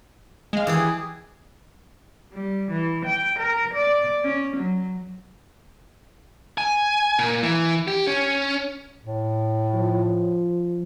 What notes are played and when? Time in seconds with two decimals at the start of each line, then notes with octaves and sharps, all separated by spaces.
0.53 G#3 F5
0.67 E3 G4 G#4
2.33 G3
2.71 E3
3.05 G5
3.39 A#4
3.74 D5
4.24 C#4
4.57 F#3
6.58 G#5
7.19 A#2
7.43 E3
7.88 G4
8.07 C#4
9.04 A2
9.74 F3